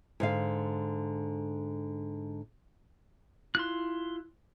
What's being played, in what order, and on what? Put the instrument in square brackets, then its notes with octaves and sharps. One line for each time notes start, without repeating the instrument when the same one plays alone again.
[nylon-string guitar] G#2 D3 F5
[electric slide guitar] E4 F4 [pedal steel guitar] C6 F#6